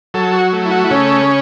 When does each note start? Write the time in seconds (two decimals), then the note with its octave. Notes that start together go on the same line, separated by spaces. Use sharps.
0.14 F#3 A4
0.33 F#4
0.53 A3
0.66 E4
0.71 F#4
0.84 E4
0.91 C#3 C#4